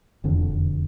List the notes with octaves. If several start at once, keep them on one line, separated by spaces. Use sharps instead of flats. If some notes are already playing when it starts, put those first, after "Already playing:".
E1 F2 D3